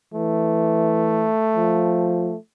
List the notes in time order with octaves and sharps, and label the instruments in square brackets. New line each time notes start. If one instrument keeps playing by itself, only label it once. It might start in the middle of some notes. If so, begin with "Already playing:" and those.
[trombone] E3 [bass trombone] A3
[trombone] F3